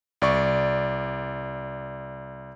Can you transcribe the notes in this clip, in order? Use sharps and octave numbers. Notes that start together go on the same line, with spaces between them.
C2 D5 C#6